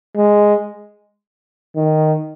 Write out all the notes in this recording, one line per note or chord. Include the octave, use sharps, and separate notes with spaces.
G#3
D#3